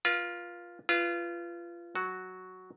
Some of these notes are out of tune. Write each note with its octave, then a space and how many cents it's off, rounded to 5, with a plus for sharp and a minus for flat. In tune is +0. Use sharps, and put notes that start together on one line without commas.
F4 +0 B4 -40
F4 -25 B4 +0
F#3 +0 F#4 +0